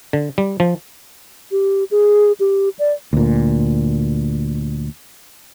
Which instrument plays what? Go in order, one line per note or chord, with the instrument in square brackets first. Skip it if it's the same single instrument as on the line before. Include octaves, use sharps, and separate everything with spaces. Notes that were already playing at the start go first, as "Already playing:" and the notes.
[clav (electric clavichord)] D3
G3
F3
[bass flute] G4
G#4
G4
D5
[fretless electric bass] D2 A#2